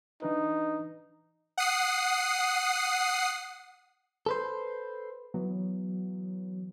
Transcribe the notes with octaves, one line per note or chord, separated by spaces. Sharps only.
E3 D4 D#4 B4
F#5 D#6 C7
A4 B4 C5
E3 F#3 B3